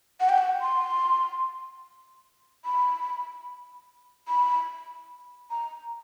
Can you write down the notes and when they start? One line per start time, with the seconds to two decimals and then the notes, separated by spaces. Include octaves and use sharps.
0.20 F#5
0.29 G5
0.38 F#5
0.61 C6
2.65 B5
4.28 B5
5.50 A#5